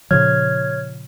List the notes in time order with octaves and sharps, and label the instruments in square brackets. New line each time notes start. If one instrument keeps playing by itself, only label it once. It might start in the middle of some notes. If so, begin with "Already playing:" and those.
[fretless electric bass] A#2 C#3 F3 [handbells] C#5 F6 G#6